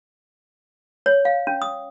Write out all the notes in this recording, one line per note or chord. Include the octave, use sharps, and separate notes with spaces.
C#5
F5
C#4
D#6